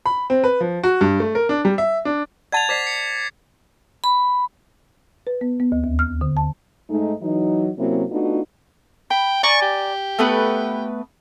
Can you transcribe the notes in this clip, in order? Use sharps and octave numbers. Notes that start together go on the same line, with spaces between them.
B5
C4
B4
F3
F#4
G2
A3
A#4
D4
G3
E5
D4
D5 F#5 A5 G#6 A6 F7
C5 D5 D6 B6 C7
C#7
B5
B4
B3
B3
D2
D#2
F6
D3
A5
G#2 G#3 A3 D#4
E3 F#3 D#4
C3 F#3 A#3 C4 C#4 E4
A3 B3 D4 D#4 F4 F#4
G5 B5
D5 G#5 A#5 C#6
G4
A3 B3 B4